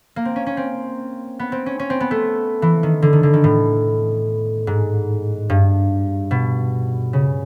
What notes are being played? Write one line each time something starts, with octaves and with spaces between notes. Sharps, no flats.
A#3
C4
C#4
C#4
C4
B3
C4
C#4
C#4
C4
B3
A3
E3
D#3
D3
D#3
D3
D#3
A2
G#2
G2
B2
C#3